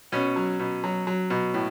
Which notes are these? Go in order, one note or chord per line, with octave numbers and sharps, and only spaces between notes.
B2 C#4
F#3
B2
F#3
F#3
B2
A2